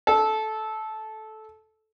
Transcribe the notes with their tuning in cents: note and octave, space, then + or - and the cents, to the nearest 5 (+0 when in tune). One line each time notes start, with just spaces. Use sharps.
A4 -15